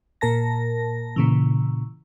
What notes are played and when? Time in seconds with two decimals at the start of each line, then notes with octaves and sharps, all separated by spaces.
0.21 A#2 A#4 A5 A#6
1.16 A#2 C#3 E3